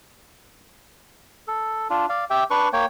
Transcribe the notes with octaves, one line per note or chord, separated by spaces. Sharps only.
A4
D4 F4
D5 F5
G4 E5 G5
D4 B4 C#6
A#3 C#5 G5